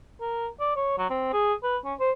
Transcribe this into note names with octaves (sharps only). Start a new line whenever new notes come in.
A#4
D5
C#5
F#3
C4
G#4
B4
C#4
C5